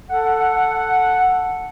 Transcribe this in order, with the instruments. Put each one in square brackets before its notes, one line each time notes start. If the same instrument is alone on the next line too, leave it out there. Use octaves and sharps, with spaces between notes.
[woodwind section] A4 F#5